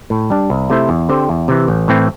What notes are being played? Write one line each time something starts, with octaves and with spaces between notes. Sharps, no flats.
A2
G3 D4
C2
C3 A3 E4 C5
E2
D3 C4 G4 C5
E2
C3 E3
A1
A2 E3 C4